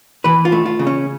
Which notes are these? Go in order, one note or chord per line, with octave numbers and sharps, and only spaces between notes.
E3 B4
F4
A3
F4
C#3
C#4